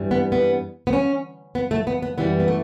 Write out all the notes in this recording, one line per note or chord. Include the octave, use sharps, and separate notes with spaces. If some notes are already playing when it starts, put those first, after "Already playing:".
Already playing: G2 E3 G3
B3
B3
B3
C#4
B3
A3
B3
B3
F#2 E3 G3 B3
B3
A3